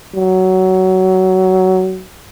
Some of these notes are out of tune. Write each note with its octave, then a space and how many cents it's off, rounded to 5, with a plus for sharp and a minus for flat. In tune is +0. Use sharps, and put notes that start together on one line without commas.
F#3 +15